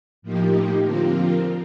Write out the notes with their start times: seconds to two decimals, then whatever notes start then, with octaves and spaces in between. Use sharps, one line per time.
0.22 A2 F3 A#3 D#4 G4
0.83 D3 F3 C4 F4 A#4